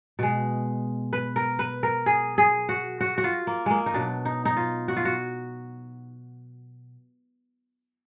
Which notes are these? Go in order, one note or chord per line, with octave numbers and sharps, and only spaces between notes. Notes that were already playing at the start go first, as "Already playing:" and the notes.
B2 G#3
B4
A#4
B4
A#4
G#4
G#4
F#4
F#4
F#4
F4
A#3
G#3 A#3
D#4
B2 F#3 D4
D#4
D#4
F4
F#4
F4
F#4